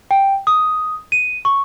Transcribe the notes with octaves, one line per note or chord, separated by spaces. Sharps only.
G5
D#6
D#7
C#6